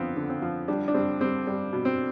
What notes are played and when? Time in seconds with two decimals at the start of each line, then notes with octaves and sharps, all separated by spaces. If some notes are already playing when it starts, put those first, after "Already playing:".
Already playing: F2 D3 F3 B3 C4
0.17 D3
0.29 C4
0.42 F3
0.68 G3 D4
0.88 D4
0.94 G3 C4
1.21 G3 C4
1.47 G3
1.73 B2
1.85 C4